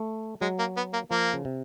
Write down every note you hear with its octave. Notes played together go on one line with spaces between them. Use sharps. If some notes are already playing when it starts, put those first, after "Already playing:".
Already playing: A3
F#3 G#3
A#3
B3
A#3
F3 A#3
C#3
C3